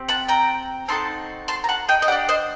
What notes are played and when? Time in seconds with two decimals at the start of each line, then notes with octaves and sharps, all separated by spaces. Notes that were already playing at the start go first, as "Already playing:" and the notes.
Already playing: C4 G4
0.08 F#5 A5
0.28 G5 A#5
0.88 C4 D#4 F#4 A4 A5 C6
1.48 A5 C6
1.64 A#5
1.69 F#5 A5
1.89 D#5 G5
2.02 D#5
2.08 D4 G4 D5 F#5
2.29 C5 D#5